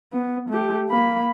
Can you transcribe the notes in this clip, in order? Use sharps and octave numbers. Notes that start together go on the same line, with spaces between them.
B3
A3 G4
A#3 B5